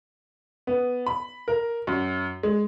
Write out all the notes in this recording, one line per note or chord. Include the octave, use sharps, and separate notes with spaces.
B3
B5
A#4
F#2
G#3